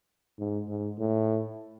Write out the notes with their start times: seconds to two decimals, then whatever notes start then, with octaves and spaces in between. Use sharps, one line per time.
0.39 G#2
0.68 G#2
0.98 A2